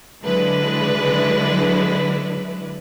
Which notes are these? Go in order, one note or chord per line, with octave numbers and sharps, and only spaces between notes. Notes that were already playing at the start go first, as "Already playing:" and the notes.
D3 F#3 G#3 D4 E4 B4